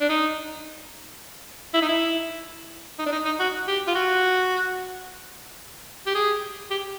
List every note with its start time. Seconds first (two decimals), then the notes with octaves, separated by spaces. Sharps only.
0.01 D4
0.09 D#4
1.74 E4
1.82 D#4
1.88 E4
2.99 D#4
3.06 D4
3.12 D#4
3.25 D#4
3.40 F#4
3.68 G4
3.88 F4
3.95 F#4
6.06 G4
6.15 G#4
6.71 G4